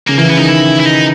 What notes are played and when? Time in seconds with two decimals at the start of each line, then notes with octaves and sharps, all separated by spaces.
0.08 C#3 A#3
0.18 E3 A#3
0.28 B3
0.37 D#3 D#4
0.47 E4
0.80 E4
0.86 D#4